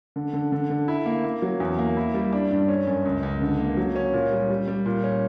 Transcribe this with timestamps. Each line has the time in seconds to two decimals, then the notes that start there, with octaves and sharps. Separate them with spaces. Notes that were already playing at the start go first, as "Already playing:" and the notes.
0.16 D3
0.34 D3
0.52 D3
0.70 D3
0.88 E4
1.06 A#3
1.24 A#3
1.42 F#3
1.60 E2
1.79 A#3
1.97 E4
2.14 G3
2.33 D4
2.51 G2
2.68 C#4
2.87 F#2
3.05 C#2
3.23 C#2
3.41 D3
3.59 A#3
3.77 F#3
3.96 C#4
4.13 A#2
4.31 G3
4.50 G3
4.68 G3
4.86 A#2
5.04 C#4